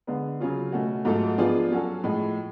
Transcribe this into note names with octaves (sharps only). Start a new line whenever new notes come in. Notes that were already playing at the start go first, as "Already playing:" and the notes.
D3 G#3 B3
C#3 F#3 C#4 F4
B2 A3 C#4 F#4
G#2 F#3 A3 F4 A4
F3 B3 D4 F4 G#4
F#3 C#4 F#4 A4
A2 F3 G#3